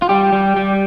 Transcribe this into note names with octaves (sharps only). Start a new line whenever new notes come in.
F4
G3 G4
G3
G3